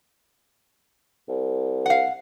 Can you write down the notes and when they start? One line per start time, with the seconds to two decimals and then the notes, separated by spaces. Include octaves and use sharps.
1.28 C2
1.86 F5 F#5